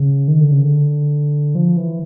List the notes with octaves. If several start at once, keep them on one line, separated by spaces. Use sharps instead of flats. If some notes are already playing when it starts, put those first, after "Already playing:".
Already playing: C#3
D#3
D3
C#3
D3
F3
E3